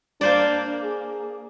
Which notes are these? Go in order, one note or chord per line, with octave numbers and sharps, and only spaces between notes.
A#3 D4 C5 D5
G#4